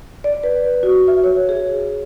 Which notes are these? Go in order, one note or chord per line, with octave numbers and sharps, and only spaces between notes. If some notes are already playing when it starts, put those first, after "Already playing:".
D5
B4
F#4
E5
C#5
G#4